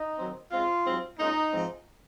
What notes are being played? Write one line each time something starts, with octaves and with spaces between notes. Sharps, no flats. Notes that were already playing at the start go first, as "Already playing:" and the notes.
Already playing: D#4 D#5
D#3 F#3 C4
C#3 G#3 C4 F4
G#2 F#3 C4
A#2 G#3 C#4 D#4
G#2 F3 G#3 C4